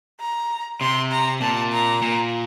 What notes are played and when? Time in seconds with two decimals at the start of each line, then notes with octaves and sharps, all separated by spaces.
0.20 A#5
0.81 C3 C6
1.12 A#5
1.41 A#2 A5
1.72 A#5
2.02 A#2